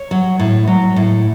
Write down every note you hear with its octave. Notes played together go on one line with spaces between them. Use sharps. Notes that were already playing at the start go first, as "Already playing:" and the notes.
Already playing: C#5
F#3
A2
F#3
A2